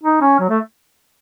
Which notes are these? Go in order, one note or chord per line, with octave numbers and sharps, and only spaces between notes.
D#4
C#4
F#3
A3